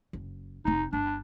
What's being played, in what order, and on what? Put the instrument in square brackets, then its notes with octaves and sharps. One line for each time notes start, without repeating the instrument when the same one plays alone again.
[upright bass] F#1
[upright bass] F1 C4 [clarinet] D#4
[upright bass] G1 [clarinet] D4